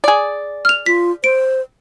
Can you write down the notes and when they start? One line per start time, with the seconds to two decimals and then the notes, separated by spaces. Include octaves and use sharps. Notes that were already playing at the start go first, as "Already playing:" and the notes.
0.04 G#4 D5
0.65 F6 F7
0.86 F4 B6
1.24 C5 D7